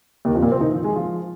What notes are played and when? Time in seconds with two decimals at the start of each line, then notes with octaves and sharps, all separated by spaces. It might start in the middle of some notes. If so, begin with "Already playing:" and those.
0.25 D#2 D#3
0.34 F2 F3
0.42 A#2 A#3
0.52 C3 C4
0.60 D#3 D#4
0.72 F3 F4
0.84 G#3 G#4
0.96 F3 F4